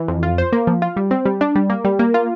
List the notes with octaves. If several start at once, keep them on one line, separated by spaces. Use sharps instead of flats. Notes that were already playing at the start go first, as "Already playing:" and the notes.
Already playing: E3
F2
F4
C5
A#3
F3
F4
G3
C4
G3
D4
G3
A#3
G3
A#3
F4